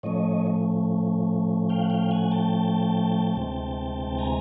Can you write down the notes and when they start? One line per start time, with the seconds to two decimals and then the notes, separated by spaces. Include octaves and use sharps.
0.03 A2 F3 A3 C#4 C#5 D#5
1.69 F5 G5
1.82 F#5
1.90 F5 G5
2.11 F#5 G#5
2.31 G5 A5
3.36 D2 C3 E3 G#3 C4
4.18 G#5 A#5